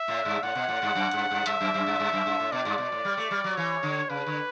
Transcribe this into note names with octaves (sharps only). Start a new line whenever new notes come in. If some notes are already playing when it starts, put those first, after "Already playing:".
Already playing: E5
A2
G2
A2 F#5
B2
A2
G2
F#2
G2
G2
G2 E5
F#2
F#2
G2
G2
F#2
G2
A2
B2 D5
G2
B2
A2
G3
A3
G3
F#3
E3 C#5
D3
C#3 B4
D3